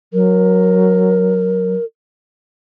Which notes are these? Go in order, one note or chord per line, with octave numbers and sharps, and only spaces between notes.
F#3 A#4